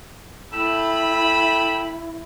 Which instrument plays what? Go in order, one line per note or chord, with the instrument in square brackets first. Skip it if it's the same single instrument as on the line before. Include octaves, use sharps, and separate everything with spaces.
[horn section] A3 G5 B5 [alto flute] E4 [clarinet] E6